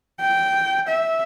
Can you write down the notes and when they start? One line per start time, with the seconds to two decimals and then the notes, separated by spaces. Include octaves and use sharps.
0.21 G5
0.88 E5